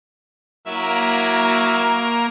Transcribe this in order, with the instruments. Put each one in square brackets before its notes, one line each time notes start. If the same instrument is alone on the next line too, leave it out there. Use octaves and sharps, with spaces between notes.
[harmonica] F#3 E4 E5 [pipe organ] A#3 A#4